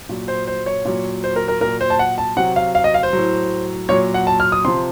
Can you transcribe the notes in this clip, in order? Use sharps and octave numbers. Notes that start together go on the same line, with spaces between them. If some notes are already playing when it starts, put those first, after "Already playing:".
A#2 F#3
C5
C5
C#5
A#2 F#3
C5
A#4
A#4
A#2 F#3 A#4
C5
A5
F#5
A5
C3 F#3 F#5
F5
F5
D#5
F5
C5
A2 F#3
A#2 F#3 C#5
F#5
A5
F6
D#6
C3 F3 C6